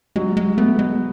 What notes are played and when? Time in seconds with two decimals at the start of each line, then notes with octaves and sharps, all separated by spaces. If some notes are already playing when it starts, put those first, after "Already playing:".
0.16 F#3 G#3
0.37 G#3
0.58 A3 B3
0.79 G#3